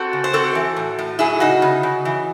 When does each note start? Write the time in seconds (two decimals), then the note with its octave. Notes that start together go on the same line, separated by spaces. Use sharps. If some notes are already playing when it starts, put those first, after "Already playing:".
Already playing: C4 F#4 A4
0.13 C#3
0.24 C5
0.33 C4 F#4 A4
0.55 E3
0.77 A2
0.99 A2
1.19 F#3 E4 G#4
1.40 C#3 D#4 F#4
1.62 C#3
1.83 C#3
2.05 E3